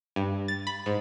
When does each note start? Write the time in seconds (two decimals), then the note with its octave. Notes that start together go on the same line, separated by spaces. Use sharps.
0.16 G2
0.48 A6
0.67 B5
0.86 G#2